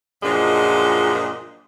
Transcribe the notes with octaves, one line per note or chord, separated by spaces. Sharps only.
F#2 A#2 F3 G#3 D4 D#5